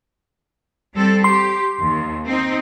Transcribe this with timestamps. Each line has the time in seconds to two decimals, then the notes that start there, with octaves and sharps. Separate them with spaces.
0.94 G3 C4 A4
1.24 G4 C6
1.80 D#2
2.26 C4 D#4